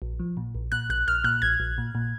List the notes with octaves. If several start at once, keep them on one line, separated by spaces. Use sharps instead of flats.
A#1
F3
A#2
A#1
A#2 F#6
A#1 F#6
A#1 F6
A#2 F#6
A#1 G#6
A#1
A#2
A#2